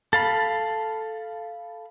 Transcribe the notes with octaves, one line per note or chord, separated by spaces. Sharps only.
A4 F5 B5 A6